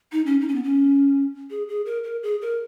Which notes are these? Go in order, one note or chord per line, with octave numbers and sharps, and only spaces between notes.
D#4
C#4
D#4
C#4
B3
C#4
G#4
G#4
A#4
A#4
G#4
A#4